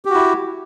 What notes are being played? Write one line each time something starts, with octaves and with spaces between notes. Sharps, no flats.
E4 F#4 G4